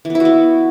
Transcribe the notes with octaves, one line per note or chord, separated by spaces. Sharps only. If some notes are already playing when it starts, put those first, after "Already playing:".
E3
B3
E4
F#4
B3